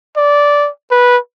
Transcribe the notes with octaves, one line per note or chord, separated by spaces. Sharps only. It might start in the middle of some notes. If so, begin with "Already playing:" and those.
D5
B4